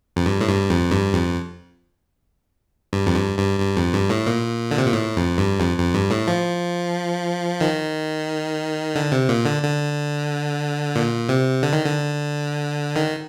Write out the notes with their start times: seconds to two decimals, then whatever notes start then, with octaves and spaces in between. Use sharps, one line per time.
0.16 F2
0.26 G2
0.41 A2
0.47 G2
0.70 F2
0.92 G2
1.14 F2
2.93 G2
3.06 F2
3.15 G2
3.38 G2
3.60 G2
3.77 F2
3.94 G2
4.10 A2
4.27 A#2
4.71 D3
4.78 C3
4.86 A#2
4.93 A2
5.17 F2
5.38 G2
5.60 F2
5.77 F2
5.94 G2
6.11 A2
6.27 F3
7.61 D#3
8.95 D3
9.12 C3
9.29 A#2
9.45 D3
9.62 D3
10.96 A#2
11.29 C3
11.63 D3
11.73 D#3
11.84 D3
12.96 D#3